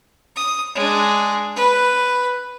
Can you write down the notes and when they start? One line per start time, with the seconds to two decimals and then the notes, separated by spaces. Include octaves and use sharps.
0.36 D#6
0.75 G#3 D4
1.56 B4